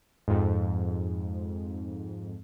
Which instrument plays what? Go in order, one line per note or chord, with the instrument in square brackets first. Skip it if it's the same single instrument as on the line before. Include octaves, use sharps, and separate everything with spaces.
[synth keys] F2 G#2